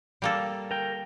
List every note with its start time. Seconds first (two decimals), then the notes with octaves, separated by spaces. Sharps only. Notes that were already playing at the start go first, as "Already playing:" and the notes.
0.22 G3 A#3 A4
0.71 A#4 G5